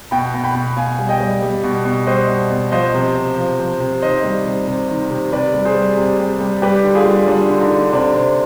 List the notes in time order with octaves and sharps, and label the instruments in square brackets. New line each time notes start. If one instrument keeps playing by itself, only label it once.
[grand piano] B2 G5 B5
B2
G5 B5
B2
B2 F5 G#5
G3
D#5 G5
G3
G3
B2
B2
G3 C5 D#5
B2
B2
F3 C5 D#5
C3
C3
F3
F3
C3
D#3 C5 D#5
G3
C3
C3
D#3
C3
C3 B4 D5
G3
G#4 C5
G3
C3
G3
G3
G3 G4 B4
D3
F4 G#4
G3
G3 D4 F4
D3
D#4
D3
C3 D4
C3